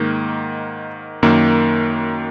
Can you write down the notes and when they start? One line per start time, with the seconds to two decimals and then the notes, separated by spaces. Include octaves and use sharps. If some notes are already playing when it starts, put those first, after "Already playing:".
Already playing: G#2 D#3 A#3
1.23 F#2 D#3 A#3